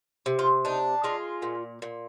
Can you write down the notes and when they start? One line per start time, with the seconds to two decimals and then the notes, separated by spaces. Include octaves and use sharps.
0.26 C3
0.39 F4
0.65 D4 D#4
1.04 G#3 F4
1.42 A#2
1.82 A#2